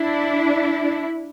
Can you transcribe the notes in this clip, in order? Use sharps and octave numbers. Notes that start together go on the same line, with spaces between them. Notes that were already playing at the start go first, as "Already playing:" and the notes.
Already playing: D4 E4